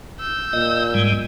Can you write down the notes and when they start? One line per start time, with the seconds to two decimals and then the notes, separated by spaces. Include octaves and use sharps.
0.20 E6 G6
0.53 A#2 D#5
0.94 G#2 G3 G#3